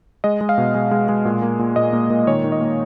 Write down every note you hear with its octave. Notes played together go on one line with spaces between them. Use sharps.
G#3 D#5
G#3
F5
B2
G#3
G#3
G#3
A#2
A#3
A#2
A#2 D#5
A#3
A#2
D#3 C#5
D#3
D#5
A#3